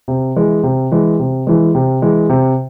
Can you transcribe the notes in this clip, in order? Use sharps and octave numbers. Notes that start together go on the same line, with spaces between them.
C3
E3 G#3
C3
E3 G#3
C3
E3 G#3
C3
E3 G#3
C3